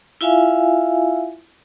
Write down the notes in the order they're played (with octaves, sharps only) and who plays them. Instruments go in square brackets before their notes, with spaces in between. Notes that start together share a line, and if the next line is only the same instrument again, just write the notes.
[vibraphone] E4 F4 E5 F5 G#5